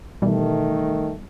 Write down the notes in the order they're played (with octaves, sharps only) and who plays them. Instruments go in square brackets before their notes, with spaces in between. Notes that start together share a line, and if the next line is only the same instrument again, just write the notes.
[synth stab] B2 E3 G3 [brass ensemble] D#3 A3